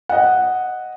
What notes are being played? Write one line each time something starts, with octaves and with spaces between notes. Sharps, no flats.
D#5 F#5